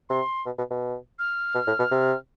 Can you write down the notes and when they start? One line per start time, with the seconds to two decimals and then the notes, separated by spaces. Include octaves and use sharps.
0.10 C3 C6
0.46 B2
0.58 B2
0.70 B2
1.19 F6
1.55 B2
1.67 A2
1.79 B2
1.91 C3